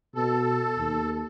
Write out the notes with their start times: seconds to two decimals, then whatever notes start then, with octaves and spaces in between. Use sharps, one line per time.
0.15 B2 A4
0.78 D#2